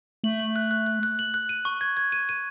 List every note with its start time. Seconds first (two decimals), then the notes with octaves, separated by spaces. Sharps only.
0.24 A3 F#7
0.40 F#7
0.56 F#6
0.71 F#6
0.86 F#6
1.03 F#6
1.19 F#7
1.34 F#6
1.49 D#7
1.65 C#6
1.81 G#6
1.97 G#6
2.12 D#7
2.29 D#7